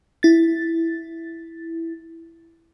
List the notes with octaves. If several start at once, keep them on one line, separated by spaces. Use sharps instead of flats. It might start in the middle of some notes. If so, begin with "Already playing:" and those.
E4 A6